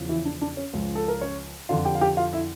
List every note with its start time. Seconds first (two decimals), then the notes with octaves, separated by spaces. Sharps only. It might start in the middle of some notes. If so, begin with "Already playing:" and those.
Already playing: E2 C#3 F3
0.09 E3 E4
0.25 D4
0.41 D4
0.57 C#4
0.73 C#2 C#3 F3
0.95 A4
1.08 A#4
1.21 C#4 C#5
1.69 F2 D3 F3 F4 F5
1.85 G4 G5
1.95 F5
2.01 G4 G5
2.17 F4 F5
2.33 E4 E5